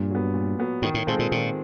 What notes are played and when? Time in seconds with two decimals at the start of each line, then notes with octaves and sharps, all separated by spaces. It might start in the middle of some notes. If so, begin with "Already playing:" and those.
Already playing: G2 A#2
0.11 F#3 B3
0.34 A#2
0.59 F#3 B3
0.82 G#2 D#3
0.94 A2
1.07 A#2 G#3 C4 F4 A4
1.19 A#2
1.31 A#2 D#3